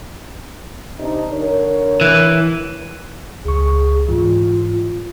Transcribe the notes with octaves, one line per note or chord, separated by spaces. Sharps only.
C3 D4 D#4
D3 A#4 C#5
E3
C#2 G#4 C#6
G#2 E3 F4